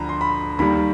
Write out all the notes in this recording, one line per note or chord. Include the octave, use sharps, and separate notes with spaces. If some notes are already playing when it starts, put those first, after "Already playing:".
Already playing: D2 D3 F3 A#5 B5
C6
B5
D#2 D#3 G3 B5